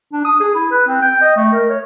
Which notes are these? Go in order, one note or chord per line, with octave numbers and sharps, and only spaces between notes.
D4
D#6
G#4
E4
B4
C4
G5
D#5
A3
A#4
C#5